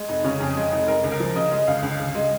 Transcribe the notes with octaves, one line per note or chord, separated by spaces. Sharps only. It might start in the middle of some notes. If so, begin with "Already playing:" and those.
Already playing: G#3
F1 D#4
C#3 C#4
F2 G#4
G#3
F1 D#4
G#3 A#4
C#2
A#4
F3
C#3 D#5
G#3 D#5
C#2 F5
C#2
C#2
G#3